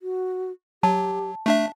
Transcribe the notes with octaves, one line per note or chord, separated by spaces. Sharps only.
F#4
F#3 G4 A5
A3 D4 E5 A5